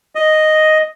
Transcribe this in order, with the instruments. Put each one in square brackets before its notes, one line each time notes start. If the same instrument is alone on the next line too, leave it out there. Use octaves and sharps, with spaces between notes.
[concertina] D#5